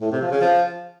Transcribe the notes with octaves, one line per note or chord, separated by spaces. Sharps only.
A2
C3
F3
C#3
F3